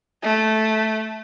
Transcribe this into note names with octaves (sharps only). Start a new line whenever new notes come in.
A3